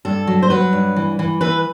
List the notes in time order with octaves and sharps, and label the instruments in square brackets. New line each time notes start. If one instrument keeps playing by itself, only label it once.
[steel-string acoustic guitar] G2 A4
F#3
C5
F#3 B4
G2
E3
E3
E3 B4